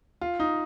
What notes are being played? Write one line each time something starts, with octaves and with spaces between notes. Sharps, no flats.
F4
D#4